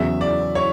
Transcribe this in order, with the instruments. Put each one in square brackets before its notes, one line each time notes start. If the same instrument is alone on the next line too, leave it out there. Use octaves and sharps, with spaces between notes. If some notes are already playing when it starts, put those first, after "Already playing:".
Already playing: [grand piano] E2 C#3 F#3 [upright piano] E5
[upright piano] D5
C#5